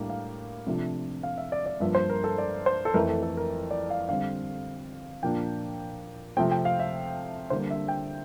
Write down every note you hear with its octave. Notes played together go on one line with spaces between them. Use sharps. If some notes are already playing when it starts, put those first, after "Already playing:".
Already playing: A2 G3 A#3 D4
F5
C3 F3 A3 D4
F5
E5
D5
D5
G2 F3 A#3 D4 E5
C5
A#4
A4
D5
C5
A4
F2 E3 A3 A#4
A4
A4
A#4
D5
F5
D3 G3 C4 F5
A#2 F3 A#3 D4 G5
C3 F3 A3 C4 G5
G5
F5
E5
D3 G3 A#3 D4 C5
E5
G5